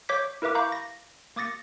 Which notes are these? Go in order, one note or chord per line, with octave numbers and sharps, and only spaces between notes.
C#5 D6 G6 B6
E4 A#4 B4 E5 D6
F5 A#5 B5 C#6 D6 G6
A#6
A#3 D6 D#6 A6 A#6 C#7